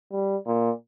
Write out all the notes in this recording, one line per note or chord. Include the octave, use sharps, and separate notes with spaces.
G3
A#2